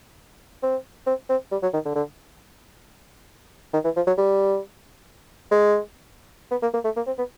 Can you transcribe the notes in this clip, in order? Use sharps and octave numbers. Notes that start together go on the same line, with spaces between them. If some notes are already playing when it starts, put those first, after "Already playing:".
C4
C4
C4
G3
F#3
D#3
D3
D3
D#3
E3
F3
F#3
G3
G#3
B3
A#3
A#3
A3
A#3
C4
B3